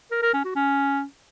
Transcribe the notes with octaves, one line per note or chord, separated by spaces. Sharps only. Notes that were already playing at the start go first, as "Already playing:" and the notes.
A#4
A#4
C#4
F#4
C#4